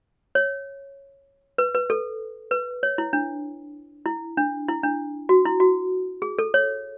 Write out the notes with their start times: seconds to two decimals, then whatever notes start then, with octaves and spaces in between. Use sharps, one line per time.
0.35 C#5
1.58 B4
1.75 B4
1.90 A4
2.51 B4
2.83 C#5
2.98 E4
3.13 D4
4.06 E4
4.37 D4
4.69 E4
4.83 D4
5.29 F#4
5.45 E4
5.60 F#4
6.22 G#4
6.39 A4
6.54 C#5